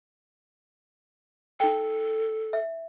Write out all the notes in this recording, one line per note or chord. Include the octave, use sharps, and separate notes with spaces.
D#4 A4 G5
E5